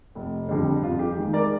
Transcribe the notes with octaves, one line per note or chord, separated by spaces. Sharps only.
F1
F2 D3 G3
F2 F4
G4
D#3 G#3
A#4 D5